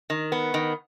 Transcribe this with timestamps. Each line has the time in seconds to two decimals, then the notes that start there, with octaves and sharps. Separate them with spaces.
0.10 D#3
0.32 B3
0.54 D#3